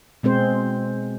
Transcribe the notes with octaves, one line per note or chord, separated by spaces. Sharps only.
B2 G#3 C4 C5